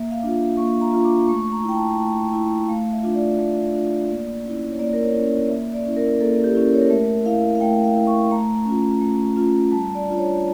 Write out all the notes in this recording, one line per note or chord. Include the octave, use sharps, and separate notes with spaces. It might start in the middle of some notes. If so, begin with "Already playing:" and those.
Already playing: A#3 E5
F5
D4 F4
A#3 C#6
A#5
D4 F4
D6
A3 C#6
C#6
A#5
E4 G5
A5
A3
E4
A3 F5
E5
D4 F4
D5
A3
D4 F4
A#3
C#4 E4
C#5
A#3 D5
A#4
C#5
C#4 E4
D5
A#3 E5
D5
C#4 E4
A#4
A#3 A4
G4
C#4 E4
A#4
C#5
A#4
A3 E5
E4 F5
F5
A3 G5
F5
E4
C#6
A3 A#5
C#4 F4
A3
C#4 F4
G3 A5
D5
D4 F4
C#5
D5